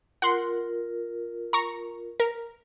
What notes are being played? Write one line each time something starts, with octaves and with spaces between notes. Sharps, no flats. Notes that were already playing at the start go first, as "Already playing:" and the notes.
F4 A#4 F#5 C6
A#5 C#6
A#4